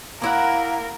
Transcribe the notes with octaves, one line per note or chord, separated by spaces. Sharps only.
A#3 E4 A#4 F5 F#5